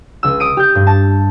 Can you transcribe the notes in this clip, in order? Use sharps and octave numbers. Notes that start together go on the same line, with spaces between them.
C#2 E6
D#6 D7 D#7
G4 G6
G2
A5